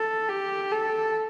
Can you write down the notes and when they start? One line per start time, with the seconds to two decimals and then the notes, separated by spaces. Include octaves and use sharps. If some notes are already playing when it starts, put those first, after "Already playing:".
Already playing: A4
0.29 G4
0.71 A4